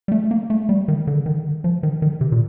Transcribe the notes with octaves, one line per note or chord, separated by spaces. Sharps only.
G3
A3
A#3
A3
G3
D#3
D3
D#3
F3
D#3
D#3
C3
A#2